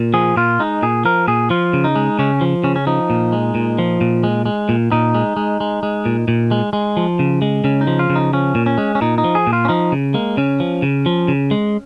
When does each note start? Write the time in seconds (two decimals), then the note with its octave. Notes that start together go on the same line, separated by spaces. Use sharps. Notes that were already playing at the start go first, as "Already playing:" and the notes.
Already playing: A#2
0.14 F3 G#4
0.36 A#2 F4
0.59 G#3 D#4
0.82 A#2 G#4
1.05 F3 A#4
1.28 A#2 G#4
1.50 F3 F4
1.73 C#3
1.84 D#4
1.96 G#3
2.19 C#3 C#4
2.41 F3
2.64 C#3 C#4
2.76 C#4
2.87 F3 D#4
3.10 A#2
3.32 G#3
3.55 A#2
3.79 F3
4.01 A#2
4.23 G#3
4.46 G#3
4.69 A#2
4.92 A#2 D#4
5.14 G#3
5.37 G#3
5.60 G#3
5.83 G#3
6.06 A#2
6.28 A#2
6.51 G#3
6.73 G#3
6.97 F3
7.19 C#3
7.42 G#3
7.64 C#3 C#4
7.81 D#4
7.87 F3
7.99 F4
8.10 C#3
8.15 D#4
8.33 F3 C#4
8.55 A#2
8.66 C#4
8.78 G#3
8.95 C#4
9.01 A#2 D#4
9.18 D#4
9.24 F3
9.35 G#4
9.47 A#2
9.53 F4
9.65 C#4
9.69 F3 D#4
9.92 C#3
10.14 G#3 A#3
10.37 C#3 C#4
10.60 F3
10.82 C#3
11.06 F3
11.28 C#3
11.51 G#3